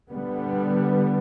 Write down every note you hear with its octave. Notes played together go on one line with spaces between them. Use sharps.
D3 G3 B3